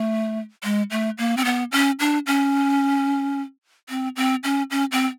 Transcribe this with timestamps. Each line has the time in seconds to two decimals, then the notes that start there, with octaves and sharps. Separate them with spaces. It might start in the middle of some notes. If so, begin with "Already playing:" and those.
Already playing: A3
0.64 G#3
0.91 A3
1.18 A#3
1.37 C4
1.45 B3
1.72 C#4
2.00 D4
2.27 C#4
3.89 C4
4.16 C4
4.44 C#4
4.71 C#4
4.92 C4